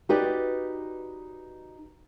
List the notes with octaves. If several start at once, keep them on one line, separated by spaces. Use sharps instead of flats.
D#4 F#4 G4 B4 D5